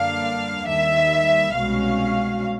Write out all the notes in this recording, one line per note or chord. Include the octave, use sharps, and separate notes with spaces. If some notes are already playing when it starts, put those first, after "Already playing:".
Already playing: F#2 D3 G3 A#3 D4 F5
D#2 D#3 G3 E5
C2 B2 G#3 C#4 F#4 F5